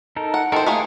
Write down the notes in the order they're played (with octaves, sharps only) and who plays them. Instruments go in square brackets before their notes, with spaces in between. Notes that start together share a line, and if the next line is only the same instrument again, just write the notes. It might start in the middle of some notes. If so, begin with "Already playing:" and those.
[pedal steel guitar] D#4 A4 A#4
[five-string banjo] F#5
[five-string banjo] D#3 C5 [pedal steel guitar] A4 A#4
[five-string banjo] A3 A#3 G#4 [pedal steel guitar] D#6